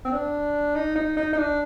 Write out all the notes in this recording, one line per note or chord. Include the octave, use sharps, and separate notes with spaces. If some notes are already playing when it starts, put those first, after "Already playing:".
C4
D4
D#4
D#4
D#4
D#4
D4